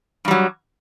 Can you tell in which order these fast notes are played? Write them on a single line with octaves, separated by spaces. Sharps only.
G2 G3 F#3